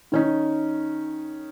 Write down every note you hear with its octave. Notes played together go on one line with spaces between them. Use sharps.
D#3 C#4 D#4